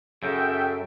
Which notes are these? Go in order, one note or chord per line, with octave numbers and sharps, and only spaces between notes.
F#2 C#3 A4 E5 G5